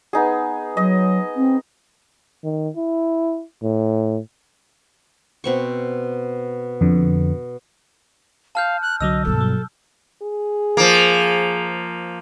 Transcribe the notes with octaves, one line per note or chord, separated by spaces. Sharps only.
B3 D#4 G#4
F#3 D#5
C4
D#3
E4
A2
B2 C4 C#6
F2 D3
F5 A5 F6 G6
F#6
C2 D3 F#3 D#5 E6
G1 B2 A4
F#3
G#4
F3 A#3